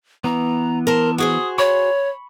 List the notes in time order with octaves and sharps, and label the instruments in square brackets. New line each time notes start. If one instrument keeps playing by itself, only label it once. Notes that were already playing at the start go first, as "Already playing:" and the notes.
[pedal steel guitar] E3 B3 [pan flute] A#5
[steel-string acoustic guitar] A#4 C5 [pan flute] A5
[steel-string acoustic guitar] F#4 G#4 C5 [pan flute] D#6
[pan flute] C#5 [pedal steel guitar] B5 C#6